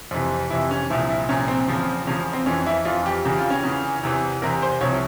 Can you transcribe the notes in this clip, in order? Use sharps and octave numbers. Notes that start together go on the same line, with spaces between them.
F2 C3 E3
F2 C3 E3 E4
C#4
C2 A#2 F3 E4
E4
C2 A#2 F3 C#4
C4
E2 C#3 F3
E2 C#3 F3 C#4
C4
F2 E3 C#4
E4
F2 E3 F4
G4
E2 C#3 E3 G4
F4
C#4
E2 C#3 E3
E2 C3 E3
E2 C3 E3 A#4
C5
C2 C3 F3 C#5